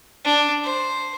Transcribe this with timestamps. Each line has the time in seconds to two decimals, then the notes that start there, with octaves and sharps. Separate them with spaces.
0.24 D4
0.63 C5